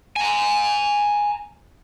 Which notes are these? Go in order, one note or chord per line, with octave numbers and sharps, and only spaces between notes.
G#5 A#5